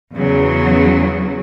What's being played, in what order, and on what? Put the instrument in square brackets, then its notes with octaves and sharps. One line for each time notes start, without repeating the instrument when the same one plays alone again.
[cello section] E2 C#3 F#3